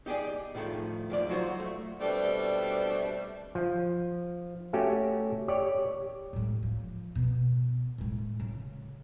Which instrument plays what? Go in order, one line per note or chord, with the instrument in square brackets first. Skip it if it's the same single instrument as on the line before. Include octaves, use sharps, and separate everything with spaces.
[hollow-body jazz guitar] D#4 G4 G#4 D5
A2 D#3 F3 A3
D#2 F3 D5
F#3 F4 F#4 B4 C5
A3
[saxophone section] B2 G3 A3 C4 D4
[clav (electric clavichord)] F3
A3 C#4 F#4 G4
G4 C#5 D5
[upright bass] A2 G#3
F3
B2
A2 G#3
C#3